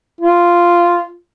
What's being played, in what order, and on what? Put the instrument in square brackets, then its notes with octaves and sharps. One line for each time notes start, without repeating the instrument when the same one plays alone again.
[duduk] F4